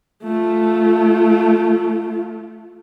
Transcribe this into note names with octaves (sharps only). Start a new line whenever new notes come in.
A3 F4